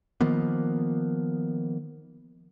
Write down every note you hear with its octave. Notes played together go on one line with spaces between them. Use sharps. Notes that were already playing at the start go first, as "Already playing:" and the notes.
D#3 F3 A#3 B3